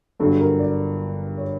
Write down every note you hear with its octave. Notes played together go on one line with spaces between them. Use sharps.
G1 G2 D3 F#3 A4
A#4
D5
C#5